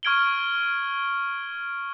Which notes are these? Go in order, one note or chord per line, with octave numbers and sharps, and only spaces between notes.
C#6 F6 G#6 D7 F#7 G7